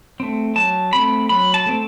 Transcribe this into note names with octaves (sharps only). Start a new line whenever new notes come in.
A3 C4
F#3 A5
A3 C4 B5
F#3 B5
A5
A3 C4